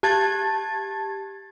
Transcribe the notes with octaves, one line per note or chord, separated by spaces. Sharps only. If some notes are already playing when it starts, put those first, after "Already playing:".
G4 A5 G#6 A6